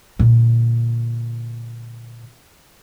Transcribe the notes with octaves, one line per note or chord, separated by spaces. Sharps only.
A#2 D3